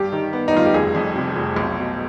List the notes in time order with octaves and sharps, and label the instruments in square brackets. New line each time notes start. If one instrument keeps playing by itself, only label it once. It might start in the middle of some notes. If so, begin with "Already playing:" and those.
Already playing: [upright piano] G2 [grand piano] G4
[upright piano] D#3
B3
[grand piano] D#4
[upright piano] G2 [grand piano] F4
[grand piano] G4
[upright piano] F1 [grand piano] G#4
[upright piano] F2
C3
F1
B1
B2